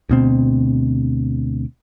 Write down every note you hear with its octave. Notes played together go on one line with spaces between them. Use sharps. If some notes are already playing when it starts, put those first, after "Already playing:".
D2 B2 C4